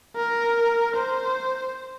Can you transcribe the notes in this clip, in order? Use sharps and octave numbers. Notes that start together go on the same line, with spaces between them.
A#4
C5